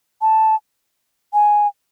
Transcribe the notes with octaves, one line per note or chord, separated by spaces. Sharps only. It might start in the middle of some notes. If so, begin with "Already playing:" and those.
A5
G#5